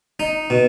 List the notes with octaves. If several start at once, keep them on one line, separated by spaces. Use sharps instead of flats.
D#4
B2